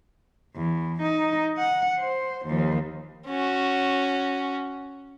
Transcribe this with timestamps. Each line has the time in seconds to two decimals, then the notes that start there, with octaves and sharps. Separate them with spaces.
0.56 E2
1.02 D#4
1.58 F#5
1.99 C5
2.46 D#2 F3
3.27 C#4 F#4